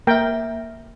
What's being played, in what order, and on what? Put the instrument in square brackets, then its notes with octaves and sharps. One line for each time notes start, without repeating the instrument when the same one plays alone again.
[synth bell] A#3 E5 [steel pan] A#4 G5